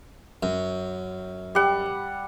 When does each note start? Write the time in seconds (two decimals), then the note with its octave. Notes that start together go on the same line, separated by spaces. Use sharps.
0.43 F#2
1.55 G3 F#5